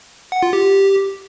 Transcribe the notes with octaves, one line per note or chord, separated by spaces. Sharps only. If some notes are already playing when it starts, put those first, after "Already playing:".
F#5
F4
G4